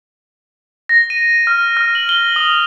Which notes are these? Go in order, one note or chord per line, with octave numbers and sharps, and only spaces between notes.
A#6
D#7
F6
F6
F#7
G7
D#6